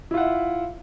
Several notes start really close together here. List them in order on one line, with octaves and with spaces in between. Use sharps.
E4 F4 F#5 E5